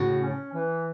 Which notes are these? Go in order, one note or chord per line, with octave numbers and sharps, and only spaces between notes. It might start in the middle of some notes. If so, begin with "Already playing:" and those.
Already playing: A2 C#3 F#4
C#4
E3